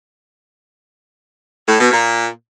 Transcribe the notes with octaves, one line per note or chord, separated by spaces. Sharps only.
A2
B2
A#2